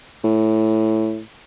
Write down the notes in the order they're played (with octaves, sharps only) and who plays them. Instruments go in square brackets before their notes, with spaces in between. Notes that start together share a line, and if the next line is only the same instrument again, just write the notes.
[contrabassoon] A2